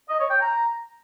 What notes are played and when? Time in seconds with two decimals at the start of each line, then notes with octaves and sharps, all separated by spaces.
0.09 D#5
0.20 C#5
0.30 G5
0.40 A#5